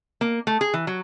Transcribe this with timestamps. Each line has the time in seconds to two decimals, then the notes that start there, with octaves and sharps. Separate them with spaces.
0.21 A#3
0.47 A3
0.61 G#4
0.74 E3
0.87 F#3